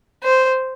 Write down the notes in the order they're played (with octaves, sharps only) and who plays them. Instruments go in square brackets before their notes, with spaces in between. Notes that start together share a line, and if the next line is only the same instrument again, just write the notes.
[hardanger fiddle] C5